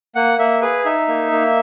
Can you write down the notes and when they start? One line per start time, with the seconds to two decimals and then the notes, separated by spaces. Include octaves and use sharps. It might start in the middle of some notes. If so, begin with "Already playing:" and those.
0.15 A#3 F#5
0.39 A#3 E5
0.62 G#4 B4
0.85 D#4 E5
1.08 A#3
1.32 A#3